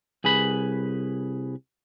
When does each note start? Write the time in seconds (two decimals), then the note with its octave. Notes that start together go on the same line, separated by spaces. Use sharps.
0.24 C2 G#4 B4 B5